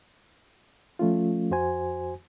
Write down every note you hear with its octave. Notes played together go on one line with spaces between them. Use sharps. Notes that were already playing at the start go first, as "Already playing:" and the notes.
F3 A3 C#4 F4
F2 F#4 C5 G#5